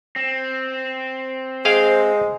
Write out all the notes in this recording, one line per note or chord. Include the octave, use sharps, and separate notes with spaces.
C4
G#3 G#4 C5 F5 G5